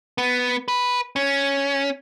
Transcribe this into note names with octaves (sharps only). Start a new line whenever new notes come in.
B3
B4
C#4